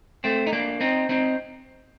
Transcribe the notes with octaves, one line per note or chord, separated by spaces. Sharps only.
A3 C4
D#4
A#3 D4
C4 D#4
C4 D#4